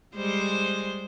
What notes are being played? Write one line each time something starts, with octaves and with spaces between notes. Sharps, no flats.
G3 G#3 C5